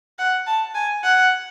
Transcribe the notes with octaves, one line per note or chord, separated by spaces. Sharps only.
F#5
A5
G#5
F#5